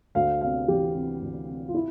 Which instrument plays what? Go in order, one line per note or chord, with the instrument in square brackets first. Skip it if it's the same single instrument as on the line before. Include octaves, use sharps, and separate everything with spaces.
[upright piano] D2 F5
C3 F5
E3 G4
C3
D2
C3
F4
E4